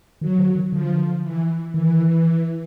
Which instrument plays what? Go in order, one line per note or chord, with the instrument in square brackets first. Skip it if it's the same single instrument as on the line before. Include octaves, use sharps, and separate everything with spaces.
[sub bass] D#3 [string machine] F#3
[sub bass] D3
D#3
[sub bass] D3 [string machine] F3
[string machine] E3
[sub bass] D#3 [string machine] E3